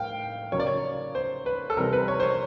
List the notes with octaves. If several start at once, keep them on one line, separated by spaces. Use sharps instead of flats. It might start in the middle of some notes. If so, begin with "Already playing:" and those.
Already playing: A2 F5 G5
C#3 F#3 A#3 C#5
D5
C#5
C5
B4
A4
C3 E3 G3 C4 A#4
B4
C#5
C5
C#5